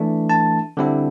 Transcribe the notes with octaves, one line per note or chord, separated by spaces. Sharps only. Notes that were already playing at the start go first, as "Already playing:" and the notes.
Already playing: E3 A3 D4
A5
D3 G3 C4 E4